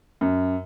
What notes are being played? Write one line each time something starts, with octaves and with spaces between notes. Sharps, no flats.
F#2